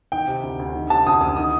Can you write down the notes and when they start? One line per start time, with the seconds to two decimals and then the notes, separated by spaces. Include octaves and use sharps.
0.12 D#3 G5
0.28 C3
0.43 D2
0.59 D2
0.75 D#3
0.90 C3 A5
1.06 D2 D#6
1.21 D2 D#6
1.37 D#3 D#6